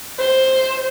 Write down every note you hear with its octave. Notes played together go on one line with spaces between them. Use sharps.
C5